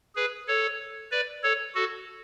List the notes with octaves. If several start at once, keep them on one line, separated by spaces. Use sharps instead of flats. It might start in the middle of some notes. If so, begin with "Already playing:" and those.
G#4 B4
A4 C#5
B4 D5
A4 C#5
F#4 A4